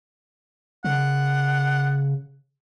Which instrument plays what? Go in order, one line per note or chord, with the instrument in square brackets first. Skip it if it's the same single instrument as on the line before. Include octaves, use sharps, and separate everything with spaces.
[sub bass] C#3 [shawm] F#5